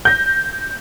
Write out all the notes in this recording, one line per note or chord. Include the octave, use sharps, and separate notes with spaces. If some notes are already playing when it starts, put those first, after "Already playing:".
G6 A#6